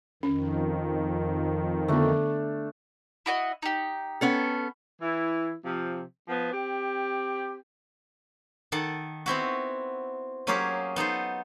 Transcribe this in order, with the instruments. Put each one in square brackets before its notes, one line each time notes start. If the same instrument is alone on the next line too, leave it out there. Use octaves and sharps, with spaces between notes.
[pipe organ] F2 D#3 [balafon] C#4
[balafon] D3 B3 [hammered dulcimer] A3 D4
[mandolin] E4 F#4 D#5
D#4 G4
[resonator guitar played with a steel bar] B3 C#4 A4
[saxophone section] E3 E4
C3 F3
F3 B3
C4 G4
[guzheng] D#3 A4 F#5 A5
B3 C4 E4 F#4
F#3 A#3 C#4 F4 G4 G#4
B3 D#4 A4 C5